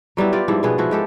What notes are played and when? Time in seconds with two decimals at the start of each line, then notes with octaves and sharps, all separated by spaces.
0.17 F#3 G3 B3 E4
0.33 F4 G4 D5
0.48 G#2 F3 G3 E4
0.63 B2 F3 B3 G#4
0.78 F3 E4 F#4
0.91 G#3 G4 A4